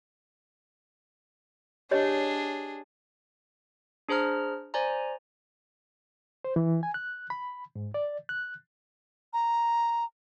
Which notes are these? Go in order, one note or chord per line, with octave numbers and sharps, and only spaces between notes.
D4 G4 G#4 C#5 D#5
D4 G#4 C5 A#5 F6
C5 D5 G#5 A#5
C5
E3
G#5
F#6
B5
G#2
D5
F#6
A#5